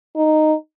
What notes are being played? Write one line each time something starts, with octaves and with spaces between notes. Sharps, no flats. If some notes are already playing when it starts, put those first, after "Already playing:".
D#4